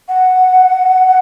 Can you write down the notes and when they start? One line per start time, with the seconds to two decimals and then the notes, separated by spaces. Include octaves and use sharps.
0.08 F#5